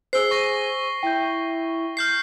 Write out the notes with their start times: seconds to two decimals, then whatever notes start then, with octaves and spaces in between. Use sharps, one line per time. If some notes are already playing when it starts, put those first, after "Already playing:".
0.13 G#4 C5 E6 C7 G7
0.31 C#6 A#6
1.03 E4 G5 G6
1.97 F6 G6 C7